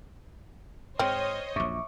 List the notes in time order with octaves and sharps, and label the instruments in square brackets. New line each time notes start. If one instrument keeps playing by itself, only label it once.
[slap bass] G#2 [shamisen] C4 [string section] C5 C#5 D#5 [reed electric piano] F6
[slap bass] A#1 F#2 [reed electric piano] E5 C#6 D6